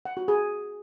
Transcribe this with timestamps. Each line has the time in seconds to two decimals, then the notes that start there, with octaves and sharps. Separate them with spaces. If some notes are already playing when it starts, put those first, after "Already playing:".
0.05 F#5
0.17 F#4
0.28 G#4